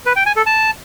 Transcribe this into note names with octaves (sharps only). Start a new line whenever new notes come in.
B4
G5
G#5
A4
A5